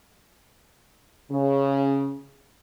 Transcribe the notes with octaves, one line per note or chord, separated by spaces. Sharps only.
C#3